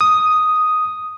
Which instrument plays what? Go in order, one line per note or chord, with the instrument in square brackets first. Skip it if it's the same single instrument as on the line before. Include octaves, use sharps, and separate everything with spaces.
[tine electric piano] D#6